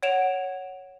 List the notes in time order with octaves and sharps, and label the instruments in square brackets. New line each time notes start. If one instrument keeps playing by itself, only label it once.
[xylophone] C#5 F#5 D7 E7 F7